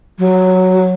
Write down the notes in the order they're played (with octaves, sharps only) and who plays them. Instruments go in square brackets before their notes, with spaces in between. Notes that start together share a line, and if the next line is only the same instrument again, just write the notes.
[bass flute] F#3